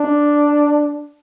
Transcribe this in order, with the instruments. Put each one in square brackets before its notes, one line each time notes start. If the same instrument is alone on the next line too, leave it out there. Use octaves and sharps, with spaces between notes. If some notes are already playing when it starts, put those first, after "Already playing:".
Already playing: [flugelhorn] D4